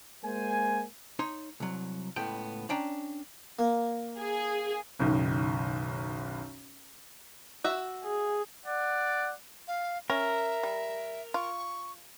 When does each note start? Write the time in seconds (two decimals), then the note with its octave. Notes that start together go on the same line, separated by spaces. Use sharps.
0.22 G#3 A#3 C5 G#5
1.19 D#4 C#5 C6
1.60 C2 F#3
2.16 C#2 A2 B3 G5
2.69 C#4 D4 G5 A#5
3.59 A#3
4.18 G#4
4.99 F#1 B1 D#3
7.64 F#4 E5
8.04 G#4
8.66 D5 F#5
9.68 F5
10.10 C#4 A#4 E5
10.63 G3
11.34 F4 C#6